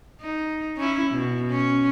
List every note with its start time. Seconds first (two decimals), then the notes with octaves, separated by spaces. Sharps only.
0.20 D#4
0.77 C#4 E4
1.11 B2
1.50 C#4